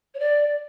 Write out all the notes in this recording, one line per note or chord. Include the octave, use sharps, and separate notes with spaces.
C#5
D5